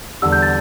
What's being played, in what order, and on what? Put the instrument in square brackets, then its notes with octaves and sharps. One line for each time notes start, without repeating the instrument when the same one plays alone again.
[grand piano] E2 D3 G3 [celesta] E6
[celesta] G6
A6